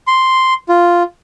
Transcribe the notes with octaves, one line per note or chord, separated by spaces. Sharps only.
C6
F4